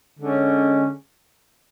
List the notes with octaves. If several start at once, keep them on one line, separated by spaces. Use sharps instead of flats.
D3 G#3 C#4